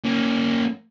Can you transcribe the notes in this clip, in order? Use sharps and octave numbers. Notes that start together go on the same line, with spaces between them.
A#3 C#4